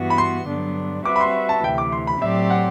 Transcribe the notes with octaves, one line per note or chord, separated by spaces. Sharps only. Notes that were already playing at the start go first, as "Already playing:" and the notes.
Already playing: G2 E3 B3 F#4
B5
C6
G2 D3 F#3 B3 D4
G3 C4 F#4 B4 E5 D6
B5
C6
A5
D2 C3 E3 G5
D6
C6
B5
A2 F#3 C4 G4 D5 E5
F#5